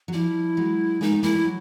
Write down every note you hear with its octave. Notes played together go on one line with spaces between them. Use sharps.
F#3
F3 G3 E4
F#3 G#3
G#3 A#3 D#4
A3 B3
G#3 A#3 E4
G3 A3
F#3